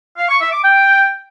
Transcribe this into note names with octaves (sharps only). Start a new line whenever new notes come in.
F5
C#6
E5
D6
G5